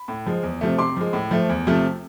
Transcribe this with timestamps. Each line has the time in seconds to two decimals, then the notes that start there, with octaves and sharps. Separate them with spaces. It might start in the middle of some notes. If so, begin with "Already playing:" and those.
Already playing: B5
0.08 A2
0.26 F3 G#3
0.43 E2
0.61 C3 F3 A3
0.78 C3 C6 D6
0.97 F3 G#3
1.13 A2
1.31 F3 A3
1.49 E2
1.67 C3 F3 A3